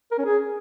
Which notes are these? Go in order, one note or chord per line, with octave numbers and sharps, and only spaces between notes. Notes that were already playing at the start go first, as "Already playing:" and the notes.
A#4
C#4
G#4